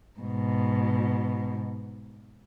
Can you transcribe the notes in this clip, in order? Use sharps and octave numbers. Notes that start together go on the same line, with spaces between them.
G#2 B2